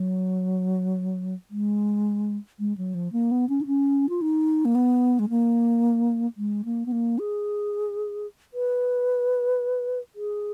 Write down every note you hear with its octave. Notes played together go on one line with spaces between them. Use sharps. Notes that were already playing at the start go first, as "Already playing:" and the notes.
Already playing: F#3
G#3
G#3
F#3
F3
A#3
B3
C#4
D#4
C#4
F4
D#4
A#3
B3
G#3
A#3
G#3
A#3
B3
A#3
G#4
B4
G#4